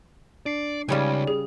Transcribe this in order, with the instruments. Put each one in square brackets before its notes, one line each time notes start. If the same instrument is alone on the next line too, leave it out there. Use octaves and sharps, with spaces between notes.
[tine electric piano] D4 C7 [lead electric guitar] D5
[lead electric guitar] C#2 [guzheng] C#3 G3 G#5 [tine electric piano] D#4 C#5 D5
[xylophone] G#4